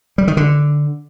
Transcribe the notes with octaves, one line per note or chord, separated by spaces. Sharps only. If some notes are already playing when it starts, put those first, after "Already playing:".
G3
D#3
D3